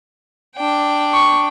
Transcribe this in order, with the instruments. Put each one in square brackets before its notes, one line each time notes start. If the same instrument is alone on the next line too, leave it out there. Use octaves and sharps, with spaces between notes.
[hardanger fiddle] D4 G5
[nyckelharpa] C#6